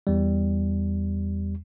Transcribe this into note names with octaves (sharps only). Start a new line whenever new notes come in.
E2 G3